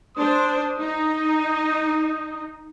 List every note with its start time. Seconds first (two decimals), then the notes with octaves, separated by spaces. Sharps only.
0.17 D4 C5 D#6
0.79 D#4